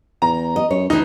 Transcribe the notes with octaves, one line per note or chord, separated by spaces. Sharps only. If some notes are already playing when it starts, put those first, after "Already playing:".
E2 A#5
D#5
F#2 C#5
D2 D3 E3 D#4